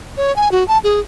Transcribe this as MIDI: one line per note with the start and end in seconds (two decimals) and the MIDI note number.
0.17 0.34 73
0.36 0.51 80
0.52 0.66 66
0.68 0.78 81
0.84 1.00 68